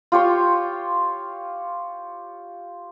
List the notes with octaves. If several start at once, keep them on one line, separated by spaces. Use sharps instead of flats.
F4 G4 C#5 C6